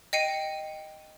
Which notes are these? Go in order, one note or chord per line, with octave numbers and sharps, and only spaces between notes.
D#5 G5 C7 C#7 D#7